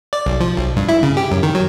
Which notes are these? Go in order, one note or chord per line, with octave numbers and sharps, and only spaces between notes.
D5
B1
F3
B1
G2
E4
C#3
G4
F#2
D#3
F#3